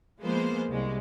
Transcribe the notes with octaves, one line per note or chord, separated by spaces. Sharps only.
F3 G#3 A#3 B3 C5
C2 G#3